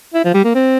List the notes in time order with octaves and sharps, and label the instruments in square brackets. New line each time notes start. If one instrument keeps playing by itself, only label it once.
[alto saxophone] E4
F3
G3
A#3
C4